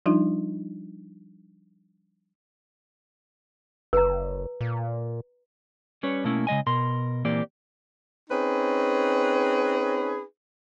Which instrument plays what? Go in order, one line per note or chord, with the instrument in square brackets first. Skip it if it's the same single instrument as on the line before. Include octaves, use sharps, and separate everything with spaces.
[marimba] F3 G3 D4 D#4 F4
[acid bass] F#1 [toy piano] B4 A#5
[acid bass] A#2
[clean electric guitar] G3 C#4 B4 C#5
B2 A3 A#3 C#4 E4
C#3 G#3 D#5 G#5
B2 A#4 C6
A#2 E3 A#3 C4 G4 D5
[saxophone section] C4 C#4 D#4 G#4 B4